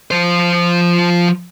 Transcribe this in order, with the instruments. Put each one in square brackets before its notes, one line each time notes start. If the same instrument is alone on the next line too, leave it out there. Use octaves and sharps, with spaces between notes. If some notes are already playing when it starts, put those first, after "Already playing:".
[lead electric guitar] F3 C5